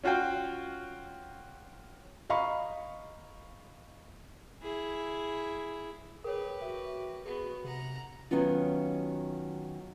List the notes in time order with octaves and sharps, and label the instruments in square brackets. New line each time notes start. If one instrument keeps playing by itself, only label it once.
[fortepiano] C#4 F4 F#4 F5 G5
[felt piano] D#5 F5 A#5 B5 C#6
[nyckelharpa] E4 G#4
[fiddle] G4 B4 [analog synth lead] G#4 [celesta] A#4 C#5
[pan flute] F#4 [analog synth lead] E5
[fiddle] B3 [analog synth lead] G#4
[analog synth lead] C3 [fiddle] F#5 A#5
[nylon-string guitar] D#3 F#3 B3 C#4 F4